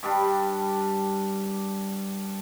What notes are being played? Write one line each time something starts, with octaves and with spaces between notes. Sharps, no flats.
G2 G3 D4